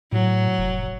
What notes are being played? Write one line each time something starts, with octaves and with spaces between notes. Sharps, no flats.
A2 F#3
F1